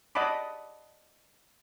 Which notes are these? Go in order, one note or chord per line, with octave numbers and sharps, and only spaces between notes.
D5 D#5 F#5 A5 B5 D6